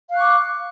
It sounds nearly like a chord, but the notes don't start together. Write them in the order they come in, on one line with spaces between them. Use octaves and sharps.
F5 F#6 C#6 D6